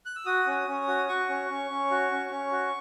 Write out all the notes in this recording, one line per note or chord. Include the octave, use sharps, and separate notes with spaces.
F#6
E6
F#4 D#6
C#4
C#4
F#4
F#4 C#6
C#4
C#4
C#4
F#4
C#4
C#4
F#4